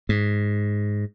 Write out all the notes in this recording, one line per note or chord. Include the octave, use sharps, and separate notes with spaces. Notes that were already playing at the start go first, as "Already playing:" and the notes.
G#2